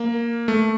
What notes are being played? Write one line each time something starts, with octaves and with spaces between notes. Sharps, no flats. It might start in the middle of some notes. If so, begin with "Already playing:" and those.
Already playing: A#3
A3